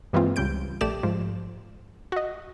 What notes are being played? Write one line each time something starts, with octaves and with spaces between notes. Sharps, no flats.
G2 E3 G#3 A#3 C4 F4
C#2 G3 C#4 G6 D7
A#1 A3 G4 D5 E7
G#2 F3
F#4 D#5